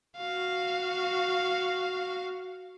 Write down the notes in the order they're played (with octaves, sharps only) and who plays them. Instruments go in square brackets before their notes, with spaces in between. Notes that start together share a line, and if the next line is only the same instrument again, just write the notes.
[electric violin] F#4 F5